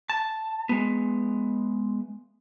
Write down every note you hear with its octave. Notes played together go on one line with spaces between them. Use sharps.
A5
G#3 B3